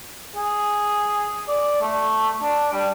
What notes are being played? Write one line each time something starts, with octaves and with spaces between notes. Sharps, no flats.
G#4
D5
A3
D4
G3